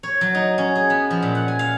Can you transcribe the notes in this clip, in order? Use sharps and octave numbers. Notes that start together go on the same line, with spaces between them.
C#5
F#3
D#4
C#4
G#4
B3
F3
A#2
F#5
G#5
F5